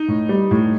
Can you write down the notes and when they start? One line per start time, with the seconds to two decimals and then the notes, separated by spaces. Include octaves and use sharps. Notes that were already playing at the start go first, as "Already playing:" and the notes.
Already playing: D#4
0.08 A2
0.29 G3
0.51 A2